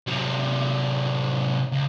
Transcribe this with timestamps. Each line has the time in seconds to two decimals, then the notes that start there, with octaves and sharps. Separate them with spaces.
0.07 C3 F#3
1.72 C#2